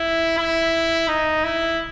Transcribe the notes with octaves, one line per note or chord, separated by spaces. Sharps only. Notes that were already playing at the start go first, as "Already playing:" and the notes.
Already playing: E4
E4
D#4
E4